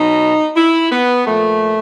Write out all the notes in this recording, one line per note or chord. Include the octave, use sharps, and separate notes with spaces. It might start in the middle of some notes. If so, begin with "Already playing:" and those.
Already playing: B2 F#3 D#4
E4
B3
A#2 F3 A3